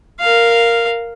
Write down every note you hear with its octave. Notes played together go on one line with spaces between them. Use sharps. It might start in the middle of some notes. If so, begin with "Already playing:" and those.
A#4 F5